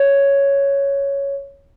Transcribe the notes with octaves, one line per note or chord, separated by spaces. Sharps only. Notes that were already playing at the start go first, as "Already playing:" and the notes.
Already playing: C#5